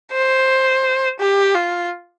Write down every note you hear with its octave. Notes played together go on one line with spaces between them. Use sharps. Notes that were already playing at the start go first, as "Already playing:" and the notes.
C5
G4
F4